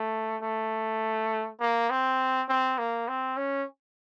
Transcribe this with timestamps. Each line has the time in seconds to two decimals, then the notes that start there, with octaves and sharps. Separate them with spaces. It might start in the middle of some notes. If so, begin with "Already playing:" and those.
Already playing: A3
0.43 A3
1.60 A#3
1.90 C4
2.49 C4
2.78 A#3
3.08 C4
3.37 C#4